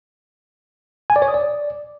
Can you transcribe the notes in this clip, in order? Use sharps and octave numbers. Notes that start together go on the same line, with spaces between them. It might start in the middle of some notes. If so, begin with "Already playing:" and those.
G#5
D5
C#5
D#6
D5